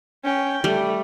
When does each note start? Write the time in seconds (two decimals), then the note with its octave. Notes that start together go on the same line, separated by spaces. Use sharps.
0.24 C#4 G5
0.64 G3 A3